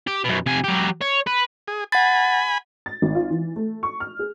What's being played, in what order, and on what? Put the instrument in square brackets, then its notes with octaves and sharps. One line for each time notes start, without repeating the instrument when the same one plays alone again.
[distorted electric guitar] G4
F#2 B2
C3 G#5
F#3 G4
C#5
B4
[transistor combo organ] G#4
[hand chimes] F#5 A6 [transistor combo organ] G#5 B5
[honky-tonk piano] A6
G#1
F4
E3
A3
C#6
F6
G#4